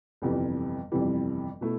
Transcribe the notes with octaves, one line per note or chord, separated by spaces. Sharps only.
G1 F2 C3 E3 G3
G1 F2 C3 E3 G3
B2 A3 E4